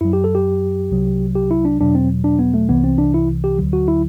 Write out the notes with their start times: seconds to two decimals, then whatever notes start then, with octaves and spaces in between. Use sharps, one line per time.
0.01 F#2 F#3 E4
0.13 G4
0.24 A4
0.35 G4
0.90 C2 C3 F#3
1.36 G4
1.51 E4
1.65 D4
1.80 E2 B2 F#3 D4
1.95 C4
2.24 D4
2.39 B3
2.54 A3
2.69 C2 C3 E3 B3
2.84 C4
2.98 D4
3.14 E4
3.44 G4
3.58 D2 D3 F#3
3.73 F#4
3.88 E4